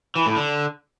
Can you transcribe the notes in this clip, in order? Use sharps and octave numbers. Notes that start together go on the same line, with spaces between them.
E3
A2
D3